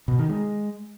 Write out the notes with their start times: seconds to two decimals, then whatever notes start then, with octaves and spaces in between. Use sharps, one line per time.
0.08 B2
0.19 D#3
0.29 G#3